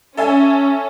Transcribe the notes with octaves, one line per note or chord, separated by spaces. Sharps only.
C#4 A4 E5 G#5